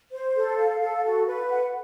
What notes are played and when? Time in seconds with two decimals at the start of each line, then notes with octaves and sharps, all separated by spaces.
0.12 C5
0.35 A4
0.58 F5
0.80 A4
1.03 F#4
1.26 B4
1.49 F#5